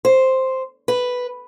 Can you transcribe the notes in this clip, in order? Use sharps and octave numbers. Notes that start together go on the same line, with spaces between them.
C5
B4